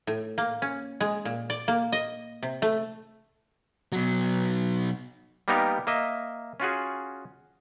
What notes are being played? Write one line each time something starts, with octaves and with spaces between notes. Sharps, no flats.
A2
A#3
C#4
G#3
A#2
D5
A#3
D#5
C3
A3
B2 F#3
G3 A#3 B3 D#4 G4 A#4
A#3 D#5 E5
C#4 F4 F#4 G#4